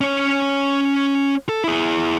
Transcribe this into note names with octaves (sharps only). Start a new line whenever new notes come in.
C#4 C#5
A4
E4 G#4